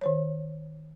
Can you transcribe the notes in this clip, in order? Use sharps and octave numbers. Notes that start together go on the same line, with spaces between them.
D#3 C5 C#5